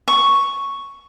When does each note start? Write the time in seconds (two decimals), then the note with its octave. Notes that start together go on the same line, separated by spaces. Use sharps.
0.08 C#6